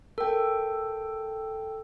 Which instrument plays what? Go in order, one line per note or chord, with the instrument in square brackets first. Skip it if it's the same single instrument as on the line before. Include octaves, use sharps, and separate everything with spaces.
[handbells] A4 G5 [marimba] A#4